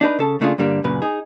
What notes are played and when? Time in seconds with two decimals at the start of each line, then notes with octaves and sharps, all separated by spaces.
0.01 D4 D#4 G#4 B4
0.19 C#3 A4 A5
0.41 C#3 A3 D4 E4 F4 G#4
0.58 G2 D3 G3 A#3 D4
0.84 F#2 A#2 C#3 B4
1.02 D#4 G#4